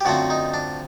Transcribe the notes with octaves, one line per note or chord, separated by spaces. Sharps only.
G4
F#2 D3 F3 A3 C4 F#4
D#4
D4